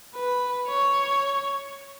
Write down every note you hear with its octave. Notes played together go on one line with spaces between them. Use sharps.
B4
C#5